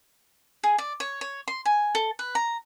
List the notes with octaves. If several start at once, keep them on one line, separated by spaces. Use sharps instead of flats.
G#4
D5
C#5
C#5
C6
G#5
A4
B4
A#5